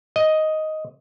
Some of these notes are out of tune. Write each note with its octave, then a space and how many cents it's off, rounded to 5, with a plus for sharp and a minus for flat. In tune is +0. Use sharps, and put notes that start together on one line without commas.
D#5 +5